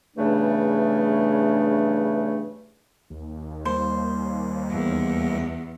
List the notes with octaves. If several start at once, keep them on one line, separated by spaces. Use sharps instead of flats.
E2 G2 C#3 A3 D4
D#2
G3 A#3 C5
E2